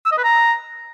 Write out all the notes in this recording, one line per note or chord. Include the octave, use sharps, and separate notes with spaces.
E6
D#5
B4
A#5